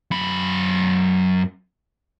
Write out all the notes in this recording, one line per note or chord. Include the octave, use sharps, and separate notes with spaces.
F#2 B5